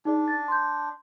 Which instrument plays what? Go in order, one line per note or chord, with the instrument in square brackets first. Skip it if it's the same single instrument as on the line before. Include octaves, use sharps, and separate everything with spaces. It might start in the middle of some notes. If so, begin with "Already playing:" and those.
[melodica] D4 [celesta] D#4 G#4 D5
[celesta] A6
C6 G6